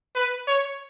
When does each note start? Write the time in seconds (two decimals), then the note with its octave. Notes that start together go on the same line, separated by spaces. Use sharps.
0.15 B4
0.48 C#5